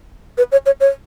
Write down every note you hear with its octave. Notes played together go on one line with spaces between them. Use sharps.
B4
C#5
C#5
C#5